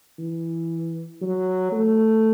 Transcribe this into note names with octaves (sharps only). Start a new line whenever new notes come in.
E3
F#3
A3